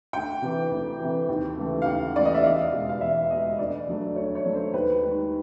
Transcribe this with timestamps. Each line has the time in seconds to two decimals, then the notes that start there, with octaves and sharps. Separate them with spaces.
0.13 D2 G5
0.42 C3 E3
0.71 D2
1.00 C3 E3
1.29 D#2
1.57 C#3 E3 A3
1.82 F5
1.86 D#2 F#5
2.15 C#3 E3 A3 D5
2.25 D#5
2.34 E5
2.44 E2 F5
2.72 B2 G#3
2.89 F5
3.01 E2 E5
3.30 B2 G#3 D#5
3.59 D2 D5
3.87 D3 F#3 A3
4.16 D2 C#5
4.35 C#5
4.45 D3 F#3 A3
4.55 C5
4.73 D#2 B4
5.02 D#3 G#3